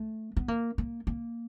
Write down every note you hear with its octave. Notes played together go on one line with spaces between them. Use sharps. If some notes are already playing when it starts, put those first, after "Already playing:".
Already playing: A3
B3
A#3
A#3
A#3